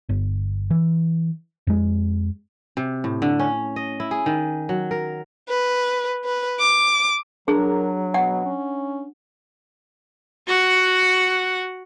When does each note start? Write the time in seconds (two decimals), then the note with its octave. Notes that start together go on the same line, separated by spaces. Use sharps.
0.09 G1
0.70 E3
1.67 F2 G#3
2.77 C3
3.04 A2
3.22 D3
3.40 C#4
3.76 D#5
4.00 E4
4.11 G#4
4.26 D#3
4.69 F#3
4.91 A#4
5.49 B4
6.24 B4
6.60 D6
7.48 F#3 D4 G#4 A#4
8.14 B2 F#5
8.45 C#4
10.47 F#4 F#5